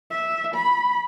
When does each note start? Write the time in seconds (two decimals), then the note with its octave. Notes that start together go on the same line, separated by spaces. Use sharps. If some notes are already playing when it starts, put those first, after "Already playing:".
0.11 E5
0.54 B5